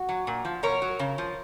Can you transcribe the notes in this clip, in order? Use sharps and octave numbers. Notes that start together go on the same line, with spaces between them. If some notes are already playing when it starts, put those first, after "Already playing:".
Already playing: F#4
F#3
A#2
F3
B2 A#4 C#5
F#3
C#3
F3